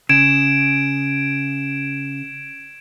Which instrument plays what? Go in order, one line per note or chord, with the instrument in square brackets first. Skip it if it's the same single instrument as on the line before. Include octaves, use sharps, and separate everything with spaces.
[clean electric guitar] C#3 [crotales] G#6 D7 E7